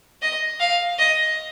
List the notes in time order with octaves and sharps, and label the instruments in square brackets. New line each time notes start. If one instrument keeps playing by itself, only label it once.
[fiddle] D#5
F5
D#5